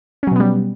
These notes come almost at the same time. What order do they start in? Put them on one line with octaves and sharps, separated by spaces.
C#4 F#3 B2 B3 G3